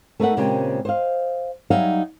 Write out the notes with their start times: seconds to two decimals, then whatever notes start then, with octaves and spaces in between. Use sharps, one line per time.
0.20 A3 D#4 A#4 B4 E5 F#5
0.37 A#2 C#3 G#3 A#3 C4 G4
0.85 C5 D#5 F5
1.70 F#3 G3 D#4 E5 F5